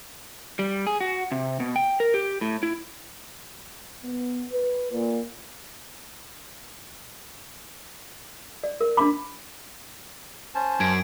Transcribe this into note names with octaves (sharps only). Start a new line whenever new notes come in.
G3
G#4
F#4
C3
B2
G5
A#4
G4
A2
E4
B3
B4
A#2
D5
A#4
D4 B5 D6
C#4 C5 A5
F#2 G#6 D7